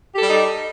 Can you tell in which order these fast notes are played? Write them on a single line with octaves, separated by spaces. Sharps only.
G4 A4 G3 D#4